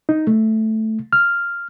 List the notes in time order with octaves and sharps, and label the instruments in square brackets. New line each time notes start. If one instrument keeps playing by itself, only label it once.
[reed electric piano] D#4
A3
F6